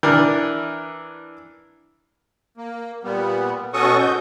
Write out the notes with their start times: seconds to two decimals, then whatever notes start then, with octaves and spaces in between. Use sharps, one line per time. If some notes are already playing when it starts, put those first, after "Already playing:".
0.03 E3 D4 A#4
2.57 A#3
3.04 A#2 G3 B3
3.73 B2 C#4 F#4 A4 C#6 D#6
3.99 G#2 F#4 G6